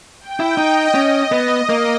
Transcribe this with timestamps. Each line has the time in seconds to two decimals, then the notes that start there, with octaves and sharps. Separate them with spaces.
0.21 G5
0.40 E4
0.57 D#4 D#5
0.94 C#4 D#5
1.32 B3
1.69 A#3